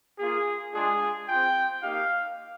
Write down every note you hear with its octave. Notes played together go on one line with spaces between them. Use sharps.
A#3 F4 G#4
G#3 D4 F4 G#4
C4 F4 G5
A#3 D#4 G4 F5